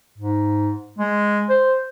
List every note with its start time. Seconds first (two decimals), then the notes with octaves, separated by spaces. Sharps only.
0.18 G#2
0.99 G#3
1.50 C5